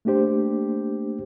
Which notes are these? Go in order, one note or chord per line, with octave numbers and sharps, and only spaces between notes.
A3 A#3 D4 G4 C5